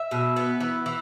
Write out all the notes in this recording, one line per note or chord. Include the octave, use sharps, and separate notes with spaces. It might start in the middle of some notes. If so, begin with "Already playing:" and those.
Already playing: E5
B2
B3
E3
E3